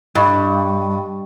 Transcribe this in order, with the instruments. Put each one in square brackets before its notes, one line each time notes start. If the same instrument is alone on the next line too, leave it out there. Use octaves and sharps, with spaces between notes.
[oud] G2 [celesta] D#5 B5 C#6